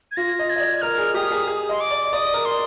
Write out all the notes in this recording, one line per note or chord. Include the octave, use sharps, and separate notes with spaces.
G#6
F4 A#6
D#5
G#6
D#5
D5
A#4 F6
G#4
G4 D#6
G#4
G#4
D#5 C6
D6
D5
D5 D#6
A#4
C6